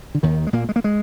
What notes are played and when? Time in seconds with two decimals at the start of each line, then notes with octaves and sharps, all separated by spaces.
0.15 D3
0.23 D#2 D#3
0.47 G#3
0.53 A#2 A#3
0.69 G#3
0.76 A#3
0.84 G#3